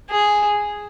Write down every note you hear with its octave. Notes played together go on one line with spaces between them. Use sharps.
G#4